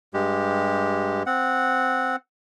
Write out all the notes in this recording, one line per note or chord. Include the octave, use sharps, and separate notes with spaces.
G2 G#3 G4
C4 F#5